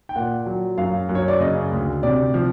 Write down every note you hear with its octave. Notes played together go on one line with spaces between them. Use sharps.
G5
A#2 F#5
F#3
F#2 F5
F#2
C#5
D5
C#3 D#5
D2
C3 D5
F3